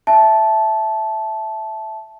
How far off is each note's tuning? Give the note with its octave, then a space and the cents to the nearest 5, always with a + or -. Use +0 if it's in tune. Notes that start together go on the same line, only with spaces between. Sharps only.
E5 +0 A5 -15